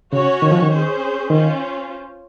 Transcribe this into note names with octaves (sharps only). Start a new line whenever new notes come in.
C#3 C#4 F#4 C#5
D#3
F3
D#3
C#4 G#4 C5
D#3 C#4 F4 C5